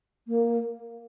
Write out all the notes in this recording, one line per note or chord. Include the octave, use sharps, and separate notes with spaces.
A#3